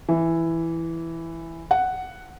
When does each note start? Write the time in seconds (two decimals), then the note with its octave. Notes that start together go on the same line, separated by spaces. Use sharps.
0.09 E3
1.71 F#5